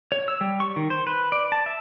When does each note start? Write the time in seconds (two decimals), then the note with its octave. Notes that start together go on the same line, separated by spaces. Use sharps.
0.12 C#5
0.28 E6
0.41 G3
0.60 C#6
0.76 D#3
0.90 C5
1.07 B4
1.32 D5
1.52 A5
1.66 E5